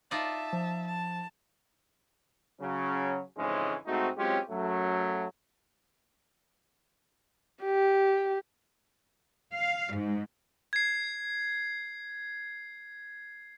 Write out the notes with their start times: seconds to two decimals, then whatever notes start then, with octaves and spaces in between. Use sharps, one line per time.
0.11 D#4 F4 D5 E5 A5
0.53 F3
0.87 A5
2.60 C#3 F#3 C#4
3.37 F2 G#2 C#3 E3 G#3 C#4
3.86 G#2 A3 C4 D#4 F#4
4.17 F#3 G#3 C4 C#4 F4 G4
4.49 F#2 F#3 A3
7.64 G4
9.53 F5
9.94 G#2
10.73 G#6 C7